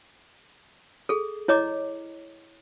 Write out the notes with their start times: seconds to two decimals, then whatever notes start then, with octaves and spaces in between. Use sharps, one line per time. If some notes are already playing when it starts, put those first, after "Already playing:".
1.09 G#4 A4
1.48 E4 C#5 D#5 A#5 D6